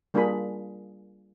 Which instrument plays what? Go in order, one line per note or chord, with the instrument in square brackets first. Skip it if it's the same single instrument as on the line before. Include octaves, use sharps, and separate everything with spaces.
[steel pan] G3 A#3 D4 F4 G#4 B5